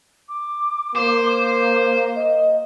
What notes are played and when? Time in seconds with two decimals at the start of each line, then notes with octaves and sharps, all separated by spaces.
0.29 D6
0.95 A#3 C5
2.16 D#5